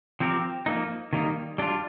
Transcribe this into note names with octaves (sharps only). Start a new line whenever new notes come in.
F3 C4 G4 A#4
F3 A#3 D#4
D#3 G3 A#3 D#4
G3 D4 F4